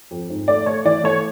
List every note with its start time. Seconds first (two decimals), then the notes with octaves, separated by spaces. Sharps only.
0.11 F2
0.30 G#2
0.48 A3 D5
0.66 A3 C#5
0.85 E3 D5
1.04 A3 C#5